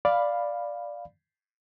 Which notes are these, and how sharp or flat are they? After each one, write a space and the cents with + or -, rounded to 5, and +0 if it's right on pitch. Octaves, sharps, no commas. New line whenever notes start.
D5 +0 F5 +0 B5 +0